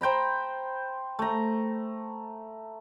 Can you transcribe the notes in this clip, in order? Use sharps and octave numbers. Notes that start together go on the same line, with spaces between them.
C5 G5 A#5 B5
A3 A#5